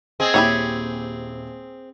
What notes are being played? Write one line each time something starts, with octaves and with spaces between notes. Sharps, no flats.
C4 G#4 D#5
D#1 E4 G4 C#5